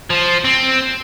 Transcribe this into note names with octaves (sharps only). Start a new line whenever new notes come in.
F3
C4